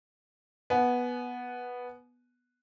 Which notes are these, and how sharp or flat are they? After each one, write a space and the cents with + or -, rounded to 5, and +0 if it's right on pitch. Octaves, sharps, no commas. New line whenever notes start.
B3 -5 G#5 +35